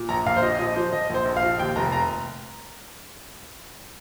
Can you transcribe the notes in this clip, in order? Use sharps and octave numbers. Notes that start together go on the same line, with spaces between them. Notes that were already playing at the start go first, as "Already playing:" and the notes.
Already playing: A#2
A#1 A#5
A#1 F5
C5
A#2 D#5
F3 D#5
F3 C5
F3 D#5
A#1 C5
A#1
F5
F3
D#2 G5
F1 A#5
A#5